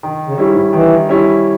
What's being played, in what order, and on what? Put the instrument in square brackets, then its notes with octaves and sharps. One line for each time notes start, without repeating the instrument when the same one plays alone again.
[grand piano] D#3
[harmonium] C#3
[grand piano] G3 C#4 E4
[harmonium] G#2
[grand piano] D#3 [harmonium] E3
[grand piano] G3 C#4 E4